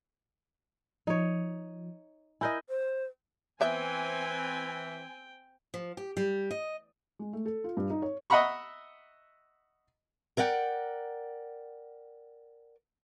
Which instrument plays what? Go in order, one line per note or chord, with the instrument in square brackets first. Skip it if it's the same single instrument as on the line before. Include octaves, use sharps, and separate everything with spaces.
[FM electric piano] F3 [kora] D#4 C#5
[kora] E4 A#4 D#5 [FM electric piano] G#5 G6
[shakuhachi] C5
[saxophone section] E3 [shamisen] B3 E5 [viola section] C4 G#5 [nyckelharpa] G5
[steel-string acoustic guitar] F3
G4
G3
D#5
[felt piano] G#3
A3
A4
F4
G2
D#4
C#5
[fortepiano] D#5 E5 F#5 A#5 B5 C#6
[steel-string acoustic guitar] A#4 D5 D#5 F#5 G5